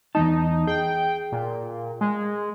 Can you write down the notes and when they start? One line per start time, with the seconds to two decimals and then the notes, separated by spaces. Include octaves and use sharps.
0.15 E2 G#3 D#4 A5
0.67 G#4 G5
1.32 A#2
2.01 G#3